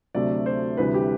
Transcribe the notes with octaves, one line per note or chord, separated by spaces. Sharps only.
D2 C3 F#3 A3 D5
C5
D2 C3 E3 G3 B4
G4